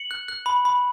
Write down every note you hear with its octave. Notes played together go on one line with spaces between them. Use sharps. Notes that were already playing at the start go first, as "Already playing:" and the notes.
Already playing: C#7 F#7
F#6
F#6
B5
B5